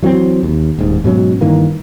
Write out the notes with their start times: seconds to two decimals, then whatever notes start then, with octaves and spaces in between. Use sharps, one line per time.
0.02 E3 F#3 B3 C4
0.43 D#2
0.79 D#1 D#2 G#2
1.04 G#2 B2 F#3 C#4
1.41 G2 D#3 E3 A#3